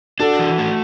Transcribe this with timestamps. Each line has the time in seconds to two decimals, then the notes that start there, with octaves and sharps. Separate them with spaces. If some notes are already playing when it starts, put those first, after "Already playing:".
0.20 D4 F#4 A4
0.39 E3
0.58 A3